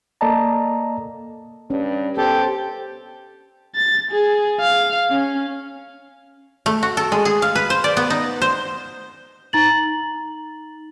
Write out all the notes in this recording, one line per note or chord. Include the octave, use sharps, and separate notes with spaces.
A#3 A4 D5 D#5 A5 A#5
G2 C#4
B3 G4 A4 C5
A6
G#4
F5
C#4
A3
F#4
A4
G#3
G#4
F5
B4
C5
D5
B3
D#4
C5
D#4 A#5 A6 F#7